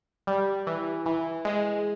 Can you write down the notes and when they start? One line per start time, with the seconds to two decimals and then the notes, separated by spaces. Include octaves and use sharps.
0.27 G3
0.67 E3
1.06 E3
1.45 G#3